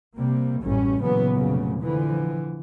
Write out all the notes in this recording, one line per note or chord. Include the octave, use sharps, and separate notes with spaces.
C3 G3 A#3
A1 F#2 G3 C#4
A#2 C#3 E3 F#3 B3
F1 A#2 C#3 F#3 A3
D3 E3 F3